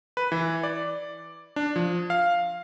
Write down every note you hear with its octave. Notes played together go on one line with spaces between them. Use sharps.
B4
E3
D5
D4
F3
F5